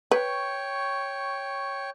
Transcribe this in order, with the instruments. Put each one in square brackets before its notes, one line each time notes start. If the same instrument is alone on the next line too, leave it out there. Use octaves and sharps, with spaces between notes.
[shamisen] B4 [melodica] C#5 G5 C#6